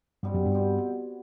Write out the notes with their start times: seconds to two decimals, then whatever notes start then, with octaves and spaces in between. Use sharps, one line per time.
0.23 G2 B2 G3 C4
0.34 F#2
0.46 G2
0.52 B2 G3 C4